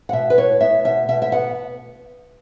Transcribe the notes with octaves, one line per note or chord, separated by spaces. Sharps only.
F#5
B2 E5
B4
E4 C#5
B3 E5
B2 E5
B2 E5
E5
B3 F#5